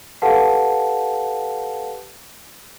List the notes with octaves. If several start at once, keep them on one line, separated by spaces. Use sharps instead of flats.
G4 A4 B4 F5 F#5 A5